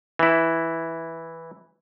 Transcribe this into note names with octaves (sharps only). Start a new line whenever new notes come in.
E3 E4